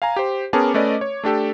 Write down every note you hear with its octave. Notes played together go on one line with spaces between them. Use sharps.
F5 G#5 A#5
G4 C5
B3 C#4 G#4 A#4 A5 D6
A3 C#4 B4 D5 D#5
C#5
A3 D4 G4 A4